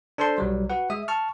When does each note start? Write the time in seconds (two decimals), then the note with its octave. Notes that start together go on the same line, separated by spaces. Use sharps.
0.18 D4 A4 C5 A5 C6
0.38 B1 F#3 G3
0.70 F#4 B4 F#5
0.90 G#3 E5 D#6
1.08 A5 C#6 F6